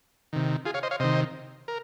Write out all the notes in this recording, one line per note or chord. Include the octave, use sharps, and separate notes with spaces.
C3 D#3
F4 G#4
C#5 F5
C5 D#5
C#5 F5
C3 D#3 C5 D#5
A#4